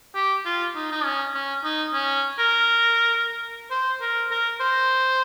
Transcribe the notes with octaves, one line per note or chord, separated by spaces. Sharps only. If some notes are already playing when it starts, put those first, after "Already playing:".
G4
F4
D#4
D#4
C#4
C#4
D#4
C#4
A#4
C5
A#4
A#4
C5